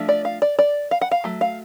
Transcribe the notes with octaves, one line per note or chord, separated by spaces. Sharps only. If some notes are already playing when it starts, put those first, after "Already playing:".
Already playing: F3 A3 D4
D5
F5
D5
D5
F5
F#5
F5
F#3 A3
F5